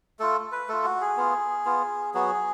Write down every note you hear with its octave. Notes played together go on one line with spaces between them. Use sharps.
A3 F4 A4
B4
A3 F4 A4
F#4
G#4
B3 F4
B3 F4
F#3 B3 F#4 G#4